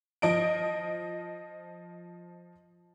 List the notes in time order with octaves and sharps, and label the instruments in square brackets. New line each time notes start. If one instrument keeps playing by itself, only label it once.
[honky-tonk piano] F3 D#5 D7